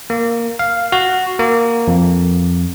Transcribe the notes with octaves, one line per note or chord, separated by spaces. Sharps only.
A#3
F5
F#4
A#3
F2